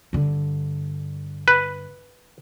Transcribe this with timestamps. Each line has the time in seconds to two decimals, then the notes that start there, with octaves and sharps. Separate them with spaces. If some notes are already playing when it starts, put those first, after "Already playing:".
0.13 G2 D3
1.48 B4